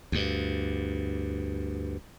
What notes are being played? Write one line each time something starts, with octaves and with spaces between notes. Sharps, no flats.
D2 G2